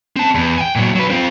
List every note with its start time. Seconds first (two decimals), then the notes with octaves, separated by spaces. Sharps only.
0.16 C4 A5
0.35 E2
0.58 G5 G#5
0.76 A#2 F#3
0.95 F#3 B4
1.10 C4 F4